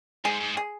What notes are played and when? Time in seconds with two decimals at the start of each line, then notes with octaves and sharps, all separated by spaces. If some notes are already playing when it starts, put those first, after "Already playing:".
0.25 G#2 G#4
0.41 G#2
0.57 G#4